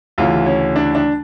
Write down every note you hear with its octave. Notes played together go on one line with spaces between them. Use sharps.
D2 C#3 E3 F4
C#4
D4
D4